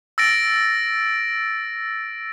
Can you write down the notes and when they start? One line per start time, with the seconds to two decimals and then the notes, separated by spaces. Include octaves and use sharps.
0.18 E6 A6 A#6 D7